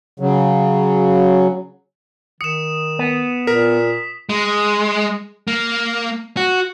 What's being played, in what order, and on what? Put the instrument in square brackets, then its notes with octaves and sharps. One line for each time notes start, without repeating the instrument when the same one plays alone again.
[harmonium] C#3 F#3
[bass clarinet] D#3 [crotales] D#6 E7 [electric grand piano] C#7
[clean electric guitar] B3
[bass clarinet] A#2 [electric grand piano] A#4 [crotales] B6
[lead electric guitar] G#3
A#3
F#4